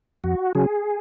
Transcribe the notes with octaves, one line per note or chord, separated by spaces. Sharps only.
F2 F#4
C#3 F#3 G#4